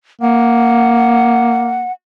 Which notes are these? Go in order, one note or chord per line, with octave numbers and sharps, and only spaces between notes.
A#3 F#5